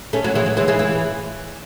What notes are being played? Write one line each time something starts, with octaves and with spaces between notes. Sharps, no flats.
A3 C#4
F#3
E3 G#3
F#3
E3 G#3
E3 G#3
E3